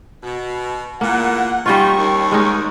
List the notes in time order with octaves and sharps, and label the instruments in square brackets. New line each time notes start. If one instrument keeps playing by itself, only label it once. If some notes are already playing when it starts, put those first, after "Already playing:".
[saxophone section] B2
[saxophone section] E2 A#2 [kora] A#3 [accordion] F#5
[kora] G3 C#4 F4 [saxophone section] D#4 [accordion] C#6
[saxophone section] D#2
[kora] G#3 C#4 D#4